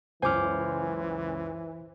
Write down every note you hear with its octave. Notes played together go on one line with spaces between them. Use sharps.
C#2 F#2 E3 C5 G#5 D6 F6